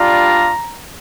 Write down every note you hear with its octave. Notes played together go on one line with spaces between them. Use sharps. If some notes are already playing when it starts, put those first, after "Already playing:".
Already playing: G3 D4 F4 A#5